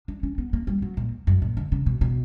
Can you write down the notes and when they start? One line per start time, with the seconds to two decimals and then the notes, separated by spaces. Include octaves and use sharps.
0.08 D4
0.23 C#4
0.38 B3
0.53 A#3
0.67 G3
0.82 F#3
0.97 A#2
1.27 F#2
1.42 A#2
1.57 D3
1.72 C#3
1.86 B2
2.01 B2